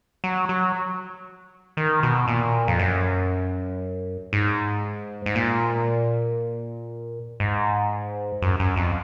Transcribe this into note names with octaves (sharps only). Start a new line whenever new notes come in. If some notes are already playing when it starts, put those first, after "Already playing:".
F#3
F#3
D#3
B2
A#2
F2
F#2
G#2
G#2
A#2
G#2
F#2
F#2
F2